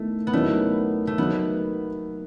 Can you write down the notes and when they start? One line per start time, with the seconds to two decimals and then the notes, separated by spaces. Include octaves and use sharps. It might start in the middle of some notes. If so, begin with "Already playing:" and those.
Already playing: D#3 A3 B3 E4
0.27 B3
0.33 E2 D#3 F#3 A3 C#4 E4
1.07 A3
1.18 D#3 F#3 B3